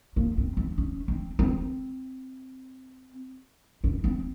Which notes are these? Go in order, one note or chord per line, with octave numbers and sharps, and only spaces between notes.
A#3
C4
C4
C#4
C4
C4
C#4
C4